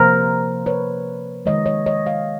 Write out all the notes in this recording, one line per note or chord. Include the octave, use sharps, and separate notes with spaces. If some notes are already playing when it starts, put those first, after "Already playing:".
Already playing: C3 F3 A#3 A#4 C5
B4 C#5
D#3 G#3 C#5 D#5
C#5 D#5
C#5 D#5
D#5 F5